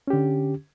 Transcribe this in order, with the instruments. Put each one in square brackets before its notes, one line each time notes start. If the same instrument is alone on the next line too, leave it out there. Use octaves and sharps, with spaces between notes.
[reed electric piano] C#4
G4
D3